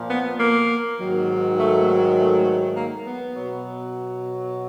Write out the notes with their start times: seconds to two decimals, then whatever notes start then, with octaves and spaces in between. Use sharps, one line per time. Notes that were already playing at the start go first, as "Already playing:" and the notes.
Already playing: A#2 F3
0.10 B3
0.40 A#3
1.00 G#2 D#3 F#3
1.59 A3
2.17 A3
2.77 A#3
3.07 B3
3.36 B2 F#3